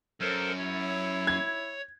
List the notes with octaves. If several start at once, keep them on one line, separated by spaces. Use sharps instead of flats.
F#2 A4 A#4 C5
E4 C#5
G#6